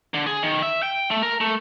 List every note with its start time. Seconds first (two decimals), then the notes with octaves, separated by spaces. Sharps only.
0.14 D3
0.26 G#4
0.43 D#3
0.62 E5
0.83 G5
1.11 A3
1.22 A#4
1.41 A3